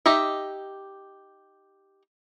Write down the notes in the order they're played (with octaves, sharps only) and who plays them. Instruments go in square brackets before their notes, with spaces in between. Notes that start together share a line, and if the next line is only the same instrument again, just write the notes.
[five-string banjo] D#4 G4 D#5 E5